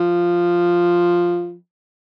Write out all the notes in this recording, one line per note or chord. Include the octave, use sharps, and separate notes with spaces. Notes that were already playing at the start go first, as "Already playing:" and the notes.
Already playing: F3